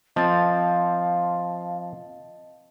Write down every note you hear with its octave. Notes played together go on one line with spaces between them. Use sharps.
F3 C4 D#5 F5 A5 A6